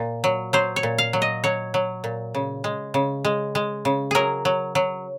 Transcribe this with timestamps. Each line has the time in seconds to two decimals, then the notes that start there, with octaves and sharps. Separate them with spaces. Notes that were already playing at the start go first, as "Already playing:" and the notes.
Already playing: A#2
0.24 F#3
0.53 F#3 C5
0.76 C#5
0.83 A#2
0.98 F5
1.13 F#3
1.22 D#5
1.44 F#3 C#5
1.74 F#3
2.04 A#2
2.35 C#3
2.64 G#3
2.94 C#3
3.25 G#3
3.55 G#3
3.85 C#3
4.11 F#3 G#4 A#4
4.45 F#3
4.75 F#3